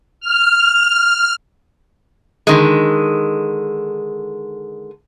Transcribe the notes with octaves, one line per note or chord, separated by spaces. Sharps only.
F6
D3 D#3 G#3